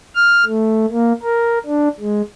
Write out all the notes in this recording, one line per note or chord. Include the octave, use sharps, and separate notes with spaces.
F6
A3
A#3
A#4
D4
G#3